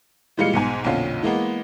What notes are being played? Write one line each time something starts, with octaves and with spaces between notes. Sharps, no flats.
A#2 E3 G3 G#3 F5 C#7
B1 G#2 G#5
B1 F2 A#2 D3 C#4 F5
E3 G#3 A#3 B3